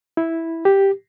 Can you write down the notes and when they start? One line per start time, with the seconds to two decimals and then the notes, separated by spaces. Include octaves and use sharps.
0.17 E4
0.65 G4